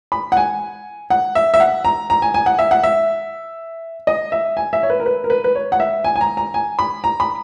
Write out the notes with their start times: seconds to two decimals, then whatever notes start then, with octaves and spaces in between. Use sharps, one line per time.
0.12 B5
0.32 F#5
0.37 G#5
1.10 F#5
1.35 E5
1.54 E5
1.60 F#5
1.85 A#5
2.10 A#5
2.22 G#5
2.34 G#5
2.46 F#5
2.59 E5
2.71 F#5
2.84 E5
4.07 D#5
4.32 E5
4.57 G#5
4.73 E5
4.83 C#5
4.90 B4
5.00 A#4
5.06 B4
5.24 A#4
5.30 B4
5.44 B4
5.55 C#5
5.72 F#5
5.80 E5
6.04 G#5
6.16 G#5
6.21 A#5
6.37 A#5
6.54 G#5
6.79 B5
7.04 A#5
7.20 B5